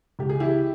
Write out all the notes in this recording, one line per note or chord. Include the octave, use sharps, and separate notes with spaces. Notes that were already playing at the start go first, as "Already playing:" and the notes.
C#2 G4
G#4
E3 E4 G4